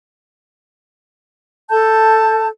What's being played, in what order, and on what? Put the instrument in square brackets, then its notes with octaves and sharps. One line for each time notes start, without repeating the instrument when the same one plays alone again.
[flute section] A4 A5 G6